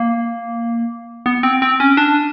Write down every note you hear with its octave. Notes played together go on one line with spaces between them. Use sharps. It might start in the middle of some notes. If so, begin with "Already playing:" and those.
Already playing: A#3
B3
C4
C4
C#4
D4